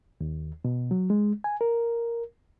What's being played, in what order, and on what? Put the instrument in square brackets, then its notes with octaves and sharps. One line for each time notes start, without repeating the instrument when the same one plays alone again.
[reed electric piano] D#2
B2
F#3
G#3
G#5
A#4